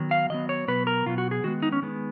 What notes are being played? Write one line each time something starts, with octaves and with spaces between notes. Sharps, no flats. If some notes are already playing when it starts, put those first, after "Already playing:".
Already playing: D#3 F#3 B3
F5
D#3 F#3 B3 D#5
C#5
B2 F#3 B3 B4
A#4
B2 F#3 B3 F4
F#4
G#4
D#3 G#3 B3 F#4
D#4
C#4
D#3 G#3 B3